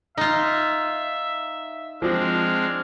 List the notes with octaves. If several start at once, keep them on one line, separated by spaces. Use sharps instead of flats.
D#4 F4 E5
F3 G#3 C4 D4 F6